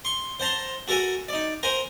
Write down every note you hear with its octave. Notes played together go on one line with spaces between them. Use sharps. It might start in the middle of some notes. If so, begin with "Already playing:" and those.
C6 C#6
C5 F#5 A5 A#5 C6
F#4 A4 A#4 F#5 G#5
D#4 D5
A#4 C5 F#5 G#5 A#5